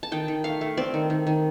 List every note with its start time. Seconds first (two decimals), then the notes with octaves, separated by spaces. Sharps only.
0.03 A5
0.12 D#3 G5
0.28 D#3
0.44 A3 F5
0.61 A3
0.77 C4 D5
0.94 D#3
1.10 D#3
1.27 D#3